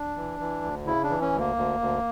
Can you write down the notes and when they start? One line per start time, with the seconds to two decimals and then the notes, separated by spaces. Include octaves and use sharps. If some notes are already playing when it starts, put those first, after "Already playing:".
Already playing: D4
0.16 E3
0.40 E3
0.63 D2
0.86 C#3 E4
1.04 D4
1.09 E3
1.21 C#4
1.33 D2
1.39 A#3
1.56 D2
1.80 D2